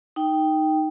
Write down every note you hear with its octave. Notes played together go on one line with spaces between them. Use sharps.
D#4 G5